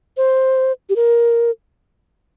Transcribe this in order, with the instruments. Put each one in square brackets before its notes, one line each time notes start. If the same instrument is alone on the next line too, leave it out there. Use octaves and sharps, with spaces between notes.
[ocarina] C5
G4
A#4